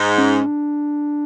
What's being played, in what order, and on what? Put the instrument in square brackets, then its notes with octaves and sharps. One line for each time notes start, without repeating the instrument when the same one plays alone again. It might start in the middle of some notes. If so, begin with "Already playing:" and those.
Already playing: [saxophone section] G#2
[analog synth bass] C#4
D4